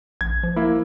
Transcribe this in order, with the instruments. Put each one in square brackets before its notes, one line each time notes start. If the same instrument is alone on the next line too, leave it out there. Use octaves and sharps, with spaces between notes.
[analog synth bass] A#1 [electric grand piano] G#6
[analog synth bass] F3
[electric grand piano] A#3 E4